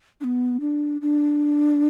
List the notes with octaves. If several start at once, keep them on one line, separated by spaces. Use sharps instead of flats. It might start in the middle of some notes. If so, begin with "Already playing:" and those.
D4
B3
D4
D4